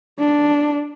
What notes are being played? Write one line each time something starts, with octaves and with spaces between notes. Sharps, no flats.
D4